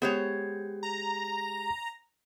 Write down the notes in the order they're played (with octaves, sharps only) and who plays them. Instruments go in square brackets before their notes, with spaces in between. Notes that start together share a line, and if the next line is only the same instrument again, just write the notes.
[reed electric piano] G#3 G4 G#4 [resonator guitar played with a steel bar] B3 C5 C#5
[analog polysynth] A#5